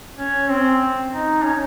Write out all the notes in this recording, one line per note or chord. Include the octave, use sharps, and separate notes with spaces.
C#4
C4
D#4
C#4